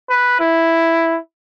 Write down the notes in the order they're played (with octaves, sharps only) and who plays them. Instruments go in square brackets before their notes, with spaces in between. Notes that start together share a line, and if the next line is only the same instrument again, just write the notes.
[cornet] B4
E4